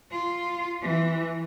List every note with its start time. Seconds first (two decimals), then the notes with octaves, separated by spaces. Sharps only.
0.11 F4
0.82 E3